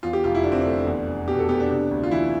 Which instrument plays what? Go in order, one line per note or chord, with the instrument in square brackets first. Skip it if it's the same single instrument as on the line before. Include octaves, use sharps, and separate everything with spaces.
[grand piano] E2 F4
G4
F1 F4
E4
D3 D4
C4
A3 D4
E2
F1
B2 G4
A4
B3 G4
D4
C3
D2
F4
E3 E4